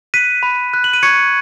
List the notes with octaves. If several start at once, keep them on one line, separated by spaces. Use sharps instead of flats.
F#6 B6 D#7
B5
F#6
F#7
D#7
C#6 G#6 C#7